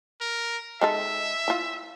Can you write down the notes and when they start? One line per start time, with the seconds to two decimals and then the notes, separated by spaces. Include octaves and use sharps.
0.21 A#4
0.81 G#3 D#4 A4 E5
1.48 E4 F4